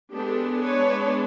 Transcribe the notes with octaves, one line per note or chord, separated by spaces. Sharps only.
G#3 B3 D4 G4 A4
B4 C#5